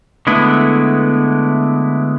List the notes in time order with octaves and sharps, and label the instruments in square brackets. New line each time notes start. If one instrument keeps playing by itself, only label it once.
[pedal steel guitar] D3 G#3 A3 B3 E4